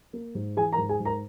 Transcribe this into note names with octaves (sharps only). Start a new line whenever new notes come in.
A#3
G#2
E3 G#4 G#5
A#4 A#5
G#2
G#4 G#5
G#2
A#4 A#5